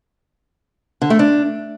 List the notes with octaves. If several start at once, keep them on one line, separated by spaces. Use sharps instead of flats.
D3
A3
D4